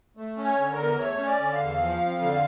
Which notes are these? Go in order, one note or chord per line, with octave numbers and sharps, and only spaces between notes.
A3
C#4
C#5
D3
A#4
E2
A3 C#5
C#4
D5
D3
F5
E2
F3
F2
D3